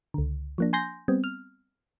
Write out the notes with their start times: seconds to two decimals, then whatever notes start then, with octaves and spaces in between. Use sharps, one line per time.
0.14 C#2 D3
0.58 F3 A#3 D4
0.73 G#5 C6 G6 A#6
1.08 G3 B3 C4
1.24 F6